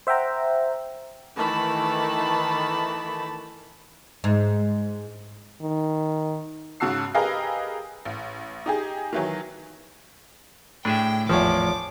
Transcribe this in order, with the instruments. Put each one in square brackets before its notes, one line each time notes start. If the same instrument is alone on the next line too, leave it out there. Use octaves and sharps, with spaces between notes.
[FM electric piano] C5 E5 F#5 G5 A#5
[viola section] D#3 E3 A3 A5 B5
[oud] G#2
[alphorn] D#3
[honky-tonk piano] G#2 C#3 F#4 A5 E6 C7
G4 G#4 A#4 B4 D#5 F5
A1
D#4 G4 G#4
D#3 E3 F#3
[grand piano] A2 [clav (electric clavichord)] D4 G#4 E5 [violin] G5
[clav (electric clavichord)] G#1 E2 [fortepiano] F3 C#5 [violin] D6